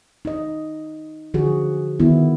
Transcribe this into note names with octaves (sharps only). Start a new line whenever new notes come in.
D#4 D#5
D3 F3 F#4 G#4
D#3 B3 E4